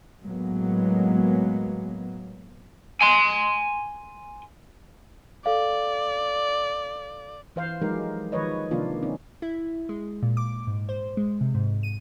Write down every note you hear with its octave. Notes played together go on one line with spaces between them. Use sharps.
A2 F#3 G#3 A#3 B3
G#5 C6
A4 D5 F5
E3 C5 F5
F3 F#3 G#3 D#4 G4 A#4
D#3 F3 G#3 B4 C#5 D#5
C3 D#3 F3 A#3 D4 F4
C4 C#4 D#4
E4
G#3
A#2
D6
G#2
C5
G#3
C3
G#2
D#7